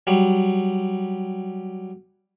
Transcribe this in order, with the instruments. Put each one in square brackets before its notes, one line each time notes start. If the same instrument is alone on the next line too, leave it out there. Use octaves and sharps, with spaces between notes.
[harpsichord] F#3 G3